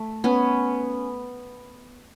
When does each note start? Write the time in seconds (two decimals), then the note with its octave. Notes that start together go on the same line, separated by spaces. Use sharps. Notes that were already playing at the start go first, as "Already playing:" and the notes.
Already playing: A3
0.24 B3 C#4